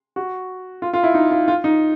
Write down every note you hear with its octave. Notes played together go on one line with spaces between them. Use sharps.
F#4
F4
F4
E4
D#4
F4
F4
D#4